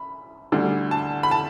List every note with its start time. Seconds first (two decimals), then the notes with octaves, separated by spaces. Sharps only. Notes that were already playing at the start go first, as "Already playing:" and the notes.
Already playing: B5
0.52 D2 D3 G3
0.91 A5
1.23 B5
1.31 A5